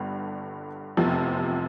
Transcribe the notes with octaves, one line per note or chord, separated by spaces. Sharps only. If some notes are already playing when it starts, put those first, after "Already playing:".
Already playing: G1 G2 D3
F1 E2 C3 F3